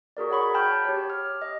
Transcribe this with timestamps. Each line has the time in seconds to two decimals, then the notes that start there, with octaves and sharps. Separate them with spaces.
0.17 F#4 G#4 A#4 D5
0.30 C#5 F#5 B5 C#6
0.54 G5 A5 B5 F6 G6
0.85 G4 C#5
1.10 F6
1.42 D#5